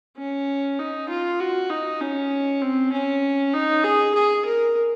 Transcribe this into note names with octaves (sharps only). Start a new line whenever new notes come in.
C#4
D#4
F4
F#4
D#4
C#4
C4
C#4
D#4
G#4
G#4
A#4